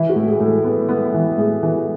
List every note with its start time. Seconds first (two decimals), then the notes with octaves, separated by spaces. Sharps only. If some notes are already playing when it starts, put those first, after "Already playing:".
Already playing: E3 E4
0.10 F#4
0.16 A2
0.28 G#4
0.40 A2
0.46 A4
0.64 B3
0.89 B3
1.14 E3
1.38 A2 G#4
1.63 E3